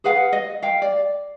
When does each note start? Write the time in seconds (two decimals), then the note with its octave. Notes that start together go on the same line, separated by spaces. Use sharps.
0.04 G#4 B4 F5 F#5
0.33 D#5
0.63 F5 G5
0.82 D5